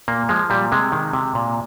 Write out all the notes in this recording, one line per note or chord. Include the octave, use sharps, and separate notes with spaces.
A#2 A#3
F3 G#3
A#2 G3
C3 G#3
D#3
C3
A#2